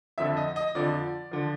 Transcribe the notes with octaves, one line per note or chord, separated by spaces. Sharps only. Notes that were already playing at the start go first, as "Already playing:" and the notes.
F2 D3 F3 E5
D#5
D#5
F2 D3 F3 D5
D3 F3